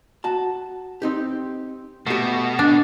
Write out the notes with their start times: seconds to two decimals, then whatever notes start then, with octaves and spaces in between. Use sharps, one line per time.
0.24 F#4 A5
1.02 C4 D#4 G4
2.07 B2 A3 G4
2.59 D4